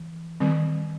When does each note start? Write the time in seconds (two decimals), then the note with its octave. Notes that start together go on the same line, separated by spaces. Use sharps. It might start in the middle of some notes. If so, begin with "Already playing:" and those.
Already playing: E3
0.40 D#3 G3 C4